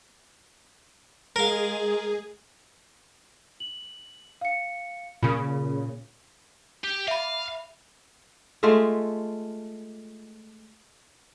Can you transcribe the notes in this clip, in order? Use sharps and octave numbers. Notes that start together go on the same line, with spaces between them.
G#3 G#4 A#4 F5
F#7
F5 C#7
A#2 C#3 B5
G4
E5 F5 B5
G#3 A3 F4 E5